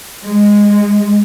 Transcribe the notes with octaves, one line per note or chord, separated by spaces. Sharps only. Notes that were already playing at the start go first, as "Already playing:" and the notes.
G#3